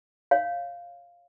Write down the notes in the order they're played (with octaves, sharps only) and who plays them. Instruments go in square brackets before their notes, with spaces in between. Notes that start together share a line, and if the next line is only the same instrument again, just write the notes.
[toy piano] C#5 F5